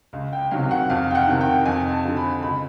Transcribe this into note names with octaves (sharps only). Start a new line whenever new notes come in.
C#2
G5
C3 D#3 F#3 F5
F#5
F2 F5
G5
F#5
C3 D#3
G5
F2 G#5
A5
D3 F3
B5
C#2 B5